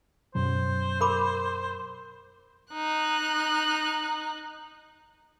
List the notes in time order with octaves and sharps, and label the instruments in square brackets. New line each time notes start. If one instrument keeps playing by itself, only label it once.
[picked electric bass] F#2 B2 F#3 [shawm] C5
[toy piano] A#4 B5 D6
[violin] D#4 F#6